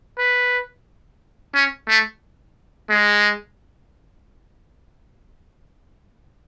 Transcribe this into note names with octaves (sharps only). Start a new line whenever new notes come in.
B4
C#4
A3
G#3